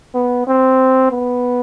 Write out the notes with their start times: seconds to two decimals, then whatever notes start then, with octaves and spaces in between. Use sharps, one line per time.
0.15 B3
0.47 C4
1.11 B3